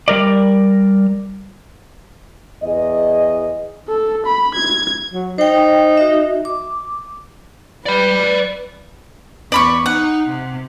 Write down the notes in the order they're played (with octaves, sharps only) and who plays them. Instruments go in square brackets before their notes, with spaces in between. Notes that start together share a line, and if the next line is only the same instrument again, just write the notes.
[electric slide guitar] G3 A#4 D5
[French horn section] E2 G#4 D#5
[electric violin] A4
B5
G#6
[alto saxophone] F#3
[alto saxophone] D#4 [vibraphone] C5 G5
[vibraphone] F#4 E5
D6
[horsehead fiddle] B4 [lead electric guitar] D5 B5
[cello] E2 [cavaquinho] D5 B5 C#6
[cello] D#4 [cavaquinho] F#5
[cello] C3